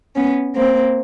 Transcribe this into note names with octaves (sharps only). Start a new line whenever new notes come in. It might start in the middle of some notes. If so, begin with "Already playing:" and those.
B3 C#4
A#3 C4